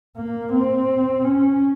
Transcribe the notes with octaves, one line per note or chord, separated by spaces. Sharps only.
A#3
C4
C#4